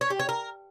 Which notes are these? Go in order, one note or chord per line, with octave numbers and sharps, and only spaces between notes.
C#5
G4
C#5
A#4